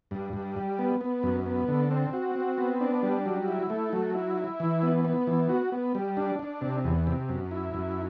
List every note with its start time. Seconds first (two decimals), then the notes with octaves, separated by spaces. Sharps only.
0.11 G2
0.33 G2
0.56 G3
0.79 B3
1.01 B3
1.23 F#2
1.46 B3
1.68 D3
1.91 C4
2.13 F#4
2.35 C4
2.58 B3
2.81 D4
3.03 G3
3.26 F#3
3.48 E4
3.70 A3
3.93 F#3
4.15 E4
4.37 E4
4.60 E3
4.83 B3
5.05 B3
5.27 E3
5.49 F#4
5.72 B3
5.95 G3
6.17 D4
6.39 D4
6.61 C3
6.84 E2
7.07 C3
7.29 F#2
7.51 E4
7.74 F#2